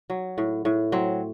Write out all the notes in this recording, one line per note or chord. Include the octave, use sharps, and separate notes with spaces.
F#3
A2
A2
F#3 C4